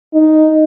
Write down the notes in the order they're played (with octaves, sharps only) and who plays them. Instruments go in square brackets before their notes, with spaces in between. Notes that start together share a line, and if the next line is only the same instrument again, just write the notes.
[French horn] D#4